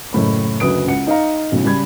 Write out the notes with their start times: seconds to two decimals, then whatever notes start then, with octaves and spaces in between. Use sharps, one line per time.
0.13 F#1 A2 B5
0.60 F#1 D2 B4 D#6 D7
0.87 C#2 F#5 C#7
1.07 D#4 D#5 F5 A#5
1.52 B1 A2 C#3
1.64 C#3 G3 B5 G#6